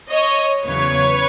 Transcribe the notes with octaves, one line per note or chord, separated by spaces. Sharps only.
C#5 D#5
E2 C#3 F#3 B4 C#5